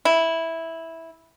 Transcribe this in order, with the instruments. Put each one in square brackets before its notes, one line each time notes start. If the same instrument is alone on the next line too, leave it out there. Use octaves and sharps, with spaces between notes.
[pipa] E4